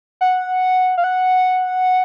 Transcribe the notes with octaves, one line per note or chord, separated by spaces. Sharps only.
F#5
F5
F#5